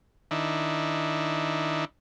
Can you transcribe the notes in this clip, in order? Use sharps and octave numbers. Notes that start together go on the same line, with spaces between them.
D#3 D4 E4